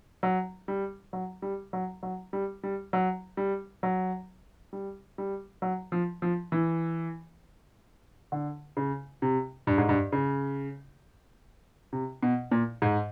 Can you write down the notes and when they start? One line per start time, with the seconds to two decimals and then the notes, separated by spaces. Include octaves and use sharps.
0.23 F#3
0.68 G3
1.13 F#3
1.42 G3
1.73 F#3
2.03 F#3
2.33 G3
2.63 G3
2.93 F#3
3.37 G3
3.83 F#3
4.73 G3
5.18 G3
5.62 F#3
5.92 F3
6.22 F3
6.52 E3
8.32 D3
8.77 C#3
9.22 C3
9.67 G2
9.78 G#2
9.89 G2
10.12 C#3
11.93 C3
12.23 B2
12.51 A#2
12.82 G#2